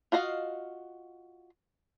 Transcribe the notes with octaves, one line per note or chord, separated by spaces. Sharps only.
F4 F#4 D#5 F5